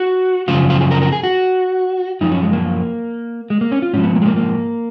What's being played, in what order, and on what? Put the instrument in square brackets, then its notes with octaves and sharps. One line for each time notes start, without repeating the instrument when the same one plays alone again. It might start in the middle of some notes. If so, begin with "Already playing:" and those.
Already playing: [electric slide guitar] F#4
F#2 C#3 F3 F4
F4
G#4
A#4
A#4
G#4
F#4
F#2 F3 D#4
C#4
G#3
A#3
G#3
A#3
C#4
F4
G#2 F3 C#4
B3
A#3
G#3
A#3
A#3